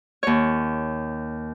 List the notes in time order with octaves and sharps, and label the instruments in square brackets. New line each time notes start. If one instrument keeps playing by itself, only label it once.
[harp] D#2 C#5